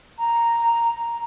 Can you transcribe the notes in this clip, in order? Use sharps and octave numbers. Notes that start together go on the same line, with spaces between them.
A#5